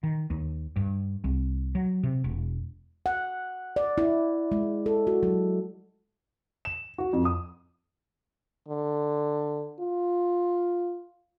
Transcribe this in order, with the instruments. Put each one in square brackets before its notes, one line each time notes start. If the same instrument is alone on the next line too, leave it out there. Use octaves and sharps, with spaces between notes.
[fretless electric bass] D#3
D#2
G2
C2
F#3
C3
E1
[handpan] F#5
D5
E4
G#3
A4
F#4
F#3
[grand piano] E7
F#4
F2
D#6
[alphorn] D3
F4